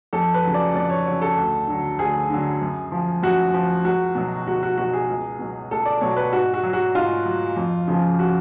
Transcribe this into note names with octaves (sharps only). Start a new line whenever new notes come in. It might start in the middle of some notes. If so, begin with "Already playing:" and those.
F2 A4
B4
C#3 F#3
D5
F2 D5
C#5
C#3 F#3 C#5
A4
D2
D3 F#3
D2 G#4
D3 F#3
F#2
F3
F#2 F#4
F3
C#2 F#4
B2 F#3
C#2 F#4
F#4
B2 F#3 F#4
G#4
C#2
B2 F#3
C#2 A4
D5
B2 F#3 C#5
B4
G#2 F#4
F#4
F#3
F#4
G#2 F4
F#3
F2
C#3 F3
F#4